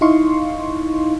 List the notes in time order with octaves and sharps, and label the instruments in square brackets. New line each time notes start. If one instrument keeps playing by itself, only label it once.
[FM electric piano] D#4 E4 D#5 F5 C6 C#6